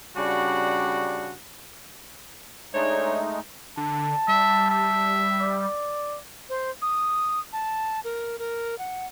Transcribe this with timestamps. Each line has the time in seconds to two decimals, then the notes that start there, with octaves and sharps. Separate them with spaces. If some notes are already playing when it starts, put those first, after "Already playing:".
0.17 C#3 G3 D4 F#4
2.74 G#3 A3 D4 D#4 C#5
3.77 D3 A5
4.28 G3 E5
4.70 E5
5.41 D5
6.49 C5
6.82 D#6
7.53 A5
8.04 A#4
8.39 A#4
8.79 F#5